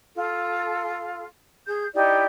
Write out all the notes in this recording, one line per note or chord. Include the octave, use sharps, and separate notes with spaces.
F4 A4
G#4 G6
D#4 E4 G4 D5